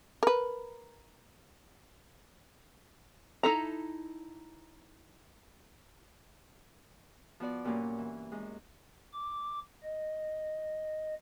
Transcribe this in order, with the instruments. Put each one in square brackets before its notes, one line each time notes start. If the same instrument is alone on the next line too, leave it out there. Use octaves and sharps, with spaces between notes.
[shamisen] A#4 B4
[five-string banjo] D#4 E4 A4 A#5
[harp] F3 B3 F#4 D5
G2 A#2 F#3 A#3 C#4
E3
F#2 G#3
[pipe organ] D6
D#5